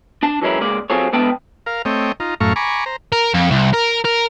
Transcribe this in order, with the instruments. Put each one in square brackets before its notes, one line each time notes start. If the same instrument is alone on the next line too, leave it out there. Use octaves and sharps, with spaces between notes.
[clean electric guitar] D4 A5
E3 F#3 G#3 C#4 E4 A#4
C#2 G#3 A#3 D5
F#3 C4 F4 G#4 A4 C#5
D3 G#3 B3 E4 G5 A5
[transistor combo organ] A#4 F5
A3 C4 C#5 D#5 G5
D#4 F4 A#5
F#2 A2 A3 F5 A#5 C#6
G#5 A#5 B5 C#6 D6
C5 A#5
[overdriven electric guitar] A#4
F2
C2
A#4
A#4